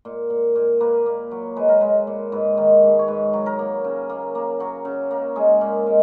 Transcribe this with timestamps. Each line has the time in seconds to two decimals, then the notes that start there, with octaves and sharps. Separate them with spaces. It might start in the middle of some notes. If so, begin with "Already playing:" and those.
0.05 A#2
0.30 A#2
0.55 A#2
0.80 A#3 B4
1.06 A#3
1.31 F#3
1.56 G#3 B4
1.68 A#4
1.81 G#3 B4
2.07 A#2
2.32 G#2 B4
2.58 D#3
2.83 G#2
2.99 C#5
3.08 G#2 B4
3.33 F#3
3.46 A#4
3.59 A#3
3.84 C#3
4.10 A#3
4.35 A#3
4.60 F#3
4.85 C#3
5.11 A#3
5.36 G#3 G#4
5.61 A#2
5.87 G#3